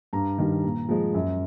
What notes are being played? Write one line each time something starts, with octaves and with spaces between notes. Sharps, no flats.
G2 A#5
D#3 G3
A#2
F3 G#3
F#2